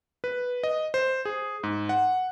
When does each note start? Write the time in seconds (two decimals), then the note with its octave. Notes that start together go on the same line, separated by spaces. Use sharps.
0.24 B4
0.64 D#5
0.94 C5
1.25 G#4
1.63 G#2
1.89 F#5